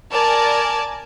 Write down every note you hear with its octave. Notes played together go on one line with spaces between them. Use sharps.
A#4 D5 G#5 A5